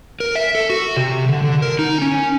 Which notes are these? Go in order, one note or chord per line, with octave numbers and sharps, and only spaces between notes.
A#4
E5
A4
F#4
C3
D3
D3
A#4
D#4
C#4